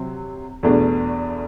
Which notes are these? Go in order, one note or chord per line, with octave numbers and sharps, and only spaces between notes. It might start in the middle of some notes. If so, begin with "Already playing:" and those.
Already playing: C3 F#3 C4
E2 B2 A3 D4